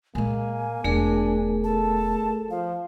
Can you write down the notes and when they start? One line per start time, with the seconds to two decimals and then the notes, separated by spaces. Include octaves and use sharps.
0.15 A#2 G#3 A#3 G#5
0.84 E1 A3 D4 G#4 A#4
1.64 A4 A5
2.50 F3 F5